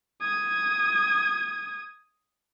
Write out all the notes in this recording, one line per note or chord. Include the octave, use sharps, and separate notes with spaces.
D#6 G#6